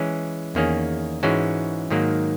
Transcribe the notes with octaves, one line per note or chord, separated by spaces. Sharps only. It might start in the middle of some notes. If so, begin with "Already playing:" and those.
Already playing: E3 G#3 C#4
E2 D#3 A#3 C#4 G#4
G#2 E3 G#3 C#4 F#4
G#2 D#3 F#3 A#3